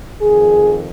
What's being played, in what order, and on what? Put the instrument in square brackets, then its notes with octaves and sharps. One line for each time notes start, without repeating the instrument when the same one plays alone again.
[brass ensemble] F2 D#3 G#4